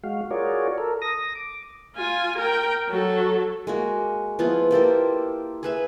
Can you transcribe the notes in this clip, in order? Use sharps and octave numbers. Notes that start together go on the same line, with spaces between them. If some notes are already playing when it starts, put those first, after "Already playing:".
G#3 F#4 F5
F4 F#4 G#4 A#4 C#5 D5
A4 A#4
D#6 A#6
D6
F4 G#5
A#4 G5
F#3 A4
G#3 A#3 F#4
F3 B3 E4 F4
A#3 G4 A4 C5
G#4 B4 E5